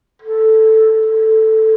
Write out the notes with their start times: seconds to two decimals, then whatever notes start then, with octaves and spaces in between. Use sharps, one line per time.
0.22 A4
1.06 A4